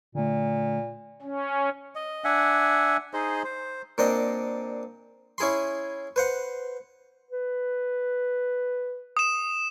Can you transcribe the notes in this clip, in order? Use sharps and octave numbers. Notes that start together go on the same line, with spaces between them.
A#2 D3 A3
C#4
D#5
D4 E5 F#5 G#5
D#4 G#4 C5 D#5
C5
A#2 C4 D4 D#5
C#4 E4 G#4 B5 C6
B4 C5 F#5
B4
D#6 E7